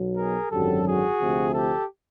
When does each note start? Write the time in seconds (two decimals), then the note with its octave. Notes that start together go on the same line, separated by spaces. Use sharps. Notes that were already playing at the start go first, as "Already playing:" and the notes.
Already playing: B1 B2 F#3
0.16 G#4 A#4
0.50 G#1 F#2 D3 F#3 G4 A4
0.85 F#4 G#4
1.20 D2 C3 F3
1.53 G4 A4